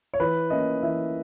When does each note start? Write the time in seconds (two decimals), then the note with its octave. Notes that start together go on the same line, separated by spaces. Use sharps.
0.14 C#5
0.20 E3 B4
0.50 A#3 C#4 E4 D#5
0.82 E3 E5